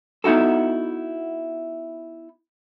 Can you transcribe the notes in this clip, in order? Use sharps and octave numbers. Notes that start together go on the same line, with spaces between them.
B3 D#4 E4 F#4 A4